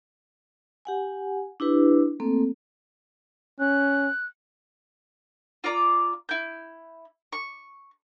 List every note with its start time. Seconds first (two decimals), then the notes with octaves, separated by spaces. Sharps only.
0.85 G4 F#5 G#5
1.60 D4 E4 G4 B4
2.20 A3 A#3 C4 A4
3.60 C#4 F#6
5.64 F4 D5 A#5 D6
6.29 E4 G6
7.33 C#6